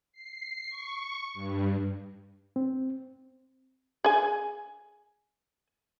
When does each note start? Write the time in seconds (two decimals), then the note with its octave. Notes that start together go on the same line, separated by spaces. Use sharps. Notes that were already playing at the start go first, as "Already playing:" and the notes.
0.13 C7
0.69 C#6
1.34 G2
2.56 C4
4.04 G#4 G#5